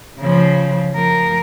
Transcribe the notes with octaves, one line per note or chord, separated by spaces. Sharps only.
C#3 F3
F3 A#4